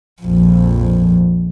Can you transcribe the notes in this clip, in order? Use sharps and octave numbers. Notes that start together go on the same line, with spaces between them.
A#1 F2